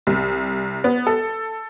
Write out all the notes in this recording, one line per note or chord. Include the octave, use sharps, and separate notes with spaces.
C2
B3
A4